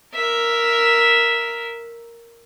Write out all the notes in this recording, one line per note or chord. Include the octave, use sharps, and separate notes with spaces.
A#4 E5